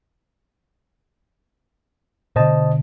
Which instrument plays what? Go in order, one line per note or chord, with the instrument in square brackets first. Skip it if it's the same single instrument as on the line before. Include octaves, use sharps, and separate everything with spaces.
[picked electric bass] B2 D3 [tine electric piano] C5 D#5 A5